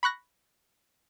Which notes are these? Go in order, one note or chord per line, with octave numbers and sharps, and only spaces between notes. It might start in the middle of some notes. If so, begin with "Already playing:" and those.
B5 C#6 F#6 A#6